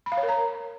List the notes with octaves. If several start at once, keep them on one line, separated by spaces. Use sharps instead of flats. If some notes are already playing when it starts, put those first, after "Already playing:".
B5
F5
C#5
A#4
A#5